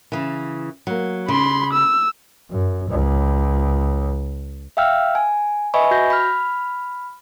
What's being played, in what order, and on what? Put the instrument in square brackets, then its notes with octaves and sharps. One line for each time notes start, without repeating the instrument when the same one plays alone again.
[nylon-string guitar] C#3 E3
F#3 A#3
[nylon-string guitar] C#3 [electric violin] B5 C6
[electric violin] E6
[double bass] F#2
C#2
[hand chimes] E5 F5 G5 E6 F6
G#5
B4 D#5 E5 G#5 B5 C#6
F#4 G6 A#6
B5 F6